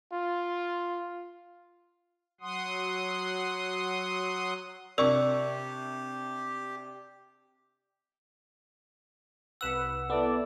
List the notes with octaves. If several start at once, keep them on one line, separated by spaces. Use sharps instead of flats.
F4
F#3 F#5 C6 D#6
C3 D4 G4 A#4 D5 C#6 E6
C2 B4 F#5 E6 E7
B3 E4 A4 D5